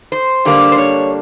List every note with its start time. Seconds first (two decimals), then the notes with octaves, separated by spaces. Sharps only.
0.12 C5
0.45 D3 G3 A#3 D4
0.72 C5
0.78 C#5